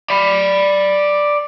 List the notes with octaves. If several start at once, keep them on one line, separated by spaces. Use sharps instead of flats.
D5 B5